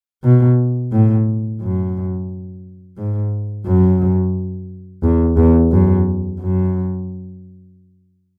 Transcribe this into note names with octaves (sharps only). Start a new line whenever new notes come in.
B2
A2
F#2
G#2
F#2
E2
E2
F#2
F#2